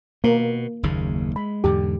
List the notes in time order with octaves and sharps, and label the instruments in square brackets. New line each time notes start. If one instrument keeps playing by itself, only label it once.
[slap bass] B2 [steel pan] A#3
[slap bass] F#1 D#2 C#3
[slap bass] G#3 [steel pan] B5
[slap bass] E2 G#2 D3 [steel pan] G4